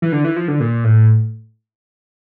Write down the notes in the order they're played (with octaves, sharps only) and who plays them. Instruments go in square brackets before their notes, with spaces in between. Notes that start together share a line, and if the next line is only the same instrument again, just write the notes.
[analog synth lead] E3
D3
E3
F3
D3
A#2
A2